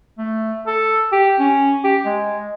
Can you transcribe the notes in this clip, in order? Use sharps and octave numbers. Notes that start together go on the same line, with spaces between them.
A3
A4
G4
C#4
G4
G#3